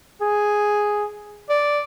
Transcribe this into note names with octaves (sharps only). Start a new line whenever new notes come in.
G#4
D5